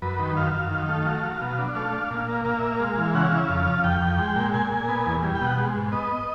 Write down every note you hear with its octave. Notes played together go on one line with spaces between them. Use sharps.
F#2 B4
D#3
F#2 F5
F#2
D#3
A3
F#3
F#3
B2
D4
A3 F5
D4
A#2
A#3
A#2 F5
A#3 E5
F5
G#3
E3
C#3 F#5
F5
C#3
E5
F2 F5
F3
F2 G5
F2
G#3
A#2
A#2 G#5
A#2
B3
E2
G3
G5
B2
F#5
G#3
G#2
B3 D#5